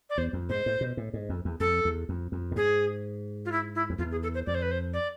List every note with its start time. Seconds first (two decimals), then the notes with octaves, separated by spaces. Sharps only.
0.10 D5
0.18 E2 C5
0.33 F2
0.49 G#2 C5
0.66 A2
0.81 B2
0.97 A2
1.13 G#2
1.29 F2
1.45 E2
1.60 F2 A4
1.85 E2
2.09 F2
2.32 F2
2.51 A2
2.55 G#2 G#4
3.45 F4
3.52 E4
3.75 E4
3.90 F2
3.98 E2 F4
4.11 G#4
4.23 A4
4.34 C5
4.46 F2 D5
4.55 C5
4.62 B4
4.71 C5
4.94 D5